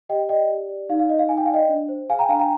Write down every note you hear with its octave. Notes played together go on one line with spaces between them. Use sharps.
G4 D#5 G5
D5 D#5 G5
G4
D5
D#4 F5
F5
D#4 D#5
F5
D#4 G#5
G5
F5
D5 D#5 G5
D4
C5
G#4 F5 G#5
G5 A#5
D4 F5 G#5
G5 A#5